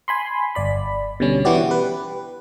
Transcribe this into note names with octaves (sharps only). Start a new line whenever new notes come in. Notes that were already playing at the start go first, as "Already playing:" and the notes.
G#5 B5 C6
G1 D5 B5
B2 D3 G3 C#4
E3 B3 E4 F#4 G4 D5
G4 B4